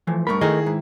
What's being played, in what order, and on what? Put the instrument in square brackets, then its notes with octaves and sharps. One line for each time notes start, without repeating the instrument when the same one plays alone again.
[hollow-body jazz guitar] E3 F3 A3
[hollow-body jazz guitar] G2 A3 B5 [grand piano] A#4 C#6
[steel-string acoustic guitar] D#3 E4 B4 [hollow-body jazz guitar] A3 A#4 D#5 [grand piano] G#4
[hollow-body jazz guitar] G#2